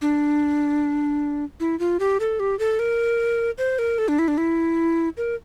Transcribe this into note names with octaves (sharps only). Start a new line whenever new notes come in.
D4
E4
F4
G4
A4
G4
A4
A#4
C5
A#4
A4
D4
E4
D4
E4
A#4